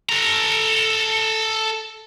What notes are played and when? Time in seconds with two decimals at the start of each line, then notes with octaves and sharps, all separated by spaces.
0.09 A4 A#5